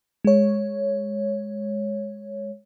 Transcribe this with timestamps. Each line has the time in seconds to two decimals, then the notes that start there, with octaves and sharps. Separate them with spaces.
0.25 G#3 C#5